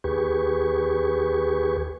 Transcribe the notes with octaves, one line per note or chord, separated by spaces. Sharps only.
D#2 G4 G#4 B4 C#6